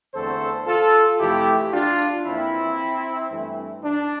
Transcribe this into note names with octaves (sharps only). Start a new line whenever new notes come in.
E2 D3 A3 C4 A4 C5
F4 A4
F2 C3 E3 A3 E4 G4
D4 F4
F2 E3 A#3 C4 E4
G2 E3 A3 C4
D4